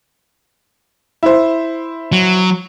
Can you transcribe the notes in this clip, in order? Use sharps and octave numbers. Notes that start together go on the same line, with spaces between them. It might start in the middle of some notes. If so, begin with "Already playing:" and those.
E4 C5
F#3